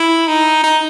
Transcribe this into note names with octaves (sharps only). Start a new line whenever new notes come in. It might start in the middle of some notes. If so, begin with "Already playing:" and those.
Already playing: E4
D#4
D#4